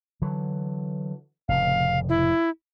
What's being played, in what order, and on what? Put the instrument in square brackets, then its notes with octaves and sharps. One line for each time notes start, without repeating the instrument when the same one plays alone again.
[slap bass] D3 E3 F#3
[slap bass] F1 A2 C#3 [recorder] F5
[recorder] E4